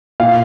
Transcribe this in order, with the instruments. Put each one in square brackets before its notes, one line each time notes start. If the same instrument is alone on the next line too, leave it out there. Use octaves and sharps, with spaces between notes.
[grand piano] A#2 F5